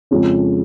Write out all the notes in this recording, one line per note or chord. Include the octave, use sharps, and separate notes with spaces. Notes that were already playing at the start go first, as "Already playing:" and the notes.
F2 C#3 F3 G#3 C#4